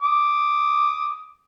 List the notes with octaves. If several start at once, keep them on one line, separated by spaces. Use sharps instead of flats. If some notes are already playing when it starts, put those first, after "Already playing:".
D6 D#6